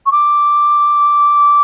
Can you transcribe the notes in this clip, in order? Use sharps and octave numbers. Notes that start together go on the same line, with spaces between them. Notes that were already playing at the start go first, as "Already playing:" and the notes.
C#6
D6